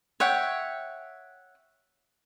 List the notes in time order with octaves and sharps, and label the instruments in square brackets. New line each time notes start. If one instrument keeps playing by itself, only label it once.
[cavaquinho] C#5 E5 F#5 G5